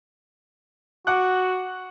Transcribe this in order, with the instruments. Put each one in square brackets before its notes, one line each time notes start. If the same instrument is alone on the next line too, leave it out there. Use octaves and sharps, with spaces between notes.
[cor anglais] F#4 [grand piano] F#5 D6 F#6